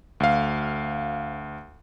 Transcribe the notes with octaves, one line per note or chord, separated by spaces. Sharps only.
D2 F5